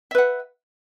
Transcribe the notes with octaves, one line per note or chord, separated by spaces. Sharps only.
B4 E5 F#5